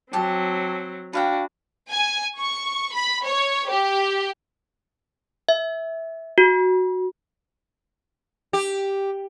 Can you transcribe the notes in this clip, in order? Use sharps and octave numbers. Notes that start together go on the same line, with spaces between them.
F#3 C4 G4 A5
D4 F#4 B4 F5 G5
G#5
C#6
B5
C#5
G4
E5
F#4
G4